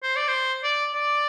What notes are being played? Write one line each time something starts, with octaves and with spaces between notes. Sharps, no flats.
C5
D5
C5
D5
D5